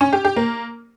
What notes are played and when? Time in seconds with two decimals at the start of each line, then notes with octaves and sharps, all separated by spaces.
0.01 C#4
0.13 G4
0.24 G4
0.36 A#3